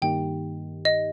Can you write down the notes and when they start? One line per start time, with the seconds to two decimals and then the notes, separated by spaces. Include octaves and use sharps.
0.02 G2 D#3 A#3 D#4 G4 G5
0.85 D#5